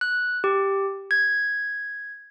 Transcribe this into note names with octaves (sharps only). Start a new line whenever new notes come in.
F#6
G4
G#6